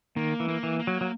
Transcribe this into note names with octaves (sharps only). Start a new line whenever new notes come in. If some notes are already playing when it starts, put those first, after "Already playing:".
D#3 A#3
E3
A#3
E3
A#3
F#3
F#3